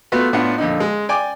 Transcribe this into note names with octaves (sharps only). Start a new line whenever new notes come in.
A3 B3 F4 F#4 B4
A2 B3 D4 F4 F#5
F2 A#2 D3 D#4
G#3
D5 G5 G#5 D6